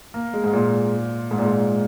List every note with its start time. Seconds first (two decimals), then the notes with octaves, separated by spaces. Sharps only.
0.14 A#3
0.34 G#3
0.44 G#2
0.53 A#2
1.31 G#2
1.39 A#2
1.46 G#2